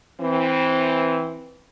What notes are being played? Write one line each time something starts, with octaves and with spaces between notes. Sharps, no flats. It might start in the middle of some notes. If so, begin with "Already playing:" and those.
E3 C4